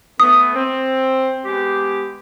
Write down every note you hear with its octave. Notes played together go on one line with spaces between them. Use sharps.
A3 B3 D#6
C4
G#3 B3 G4